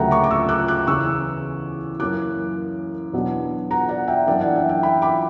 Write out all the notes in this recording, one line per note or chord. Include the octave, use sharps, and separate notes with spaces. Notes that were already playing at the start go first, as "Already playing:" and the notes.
Already playing: D2 C#3 F#3 A#3 E5 F#5 G5 A#5
A#5 C#6
D6
C#6 E6
D6 F#6
D6 F#6
E2 C#3 E3 C#6 E6
F#2 E3 A#3 C#4 D6 F#6
E2 B2 F#3 B3 D4
F#5 A#5
D5 F#5
E5 G5
F#2 E3 A#3 D4 D5 F#5
D5 F#5
E5 G5
E5 G5
G5 B5
B5 D6